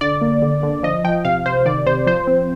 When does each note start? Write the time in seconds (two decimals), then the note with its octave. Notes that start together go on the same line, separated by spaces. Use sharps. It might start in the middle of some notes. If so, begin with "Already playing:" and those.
0.01 D3 D5
0.21 A#3
0.42 D3
0.63 D3
0.83 F3 D#5
1.04 F3 G5
1.25 C3 F5
1.46 C3 C5
1.66 D#3 D5
1.86 C3 C5
2.07 F3 C5
2.27 C4